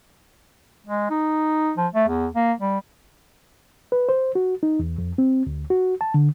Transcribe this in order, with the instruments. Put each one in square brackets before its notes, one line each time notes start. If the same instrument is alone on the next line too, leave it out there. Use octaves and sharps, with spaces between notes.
[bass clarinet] G#3
D#4
F3
A3
E2
A#3
G3
[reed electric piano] B4
C5
F#4
D#4
E2
F2
C4
D2
F#4
A5
D3